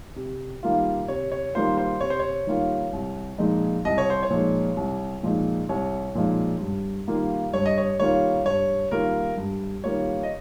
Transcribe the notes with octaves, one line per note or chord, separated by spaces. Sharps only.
C3
D#3 G3 A#3 F4
C3 C#5
C#5
D#3 G3 A#3 F4 C5
C5
C3 C#5
C5
C#5
D#3 G3 A#3 F4
C2
A#2 F3 G#3 D#4
C2 D#5
C#5
C5
C#5
A#2 F3 G#3 D#4
C2
A#2 F3 G#3 D#4
C2 C#5
A#2 F3 G#3 D#4
G2
D#3 G3 A#3 F4
G2 C#5
D#5
C#5
D#3 G3 A#3 F4 C#5
G2 C#5
D#3 G3 A#3 F4 A#4
G2
D#3 G3 A#3 F4 C#5
D#5